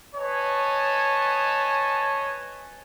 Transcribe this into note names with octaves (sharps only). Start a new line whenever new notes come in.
B4 C#5 D#5 G#5 A5